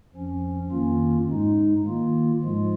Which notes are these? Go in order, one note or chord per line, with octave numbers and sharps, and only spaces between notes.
F2 F3 C#4
F2 D#3 A#3 C#4 F4
G#2 G#3 D#4
D#3 A#3 F4
G#2 F3 G#3 F4